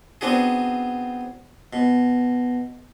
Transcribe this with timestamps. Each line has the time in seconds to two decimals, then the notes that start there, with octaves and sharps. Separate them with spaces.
0.21 B3 C4 D4 F#4 G#4
1.73 B2